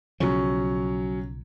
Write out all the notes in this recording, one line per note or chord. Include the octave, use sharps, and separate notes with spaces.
B1 C#3 F3 F#3 C#4